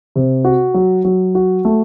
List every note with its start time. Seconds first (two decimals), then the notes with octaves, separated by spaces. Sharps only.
0.16 C3
0.45 F#4
0.74 F#3
1.05 F#3
1.35 F#4
1.65 A3